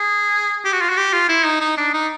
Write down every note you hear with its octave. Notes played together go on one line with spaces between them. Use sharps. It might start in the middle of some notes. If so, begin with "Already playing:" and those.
Already playing: G#4
G4
F#4
F4
F#4
G4
F4
E4
D#4
D#4
D4
D#4